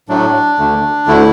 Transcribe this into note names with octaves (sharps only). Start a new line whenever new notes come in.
A2 F#3 A3 D4
D2 D3 A3
D2 D3 A3 E4